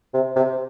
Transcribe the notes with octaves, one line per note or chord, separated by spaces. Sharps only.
C3
C3